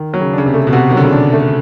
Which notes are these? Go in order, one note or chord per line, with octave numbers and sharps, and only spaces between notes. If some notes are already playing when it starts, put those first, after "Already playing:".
Already playing: D#3
F#3
C#3
C#3 D4
C3
A3
B2
C3 F#4
D#3
D3 F#3
C#3
C3 D4
A3